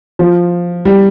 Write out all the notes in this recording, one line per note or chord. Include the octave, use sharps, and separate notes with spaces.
F3
G3